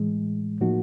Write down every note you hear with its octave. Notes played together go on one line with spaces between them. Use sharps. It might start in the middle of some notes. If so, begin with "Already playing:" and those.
Already playing: A2 E3 G#3
A2 F3 A#3 D#4 F#4